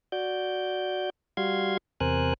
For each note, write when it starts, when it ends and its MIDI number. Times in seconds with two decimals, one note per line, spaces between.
0.12 1.10 66
0.12 1.10 74
0.12 1.10 91
1.37 1.77 55
1.37 1.77 66
1.37 1.77 77
1.37 1.77 84
1.37 1.77 92
2.00 2.34 40
2.00 2.34 48
2.00 2.34 70
2.00 2.34 72
2.00 2.34 80
2.00 2.34 90